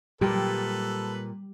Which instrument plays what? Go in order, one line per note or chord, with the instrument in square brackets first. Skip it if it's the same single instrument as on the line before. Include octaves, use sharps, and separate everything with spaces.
[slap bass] A#2 [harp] G3 [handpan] G4 [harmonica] A4 B4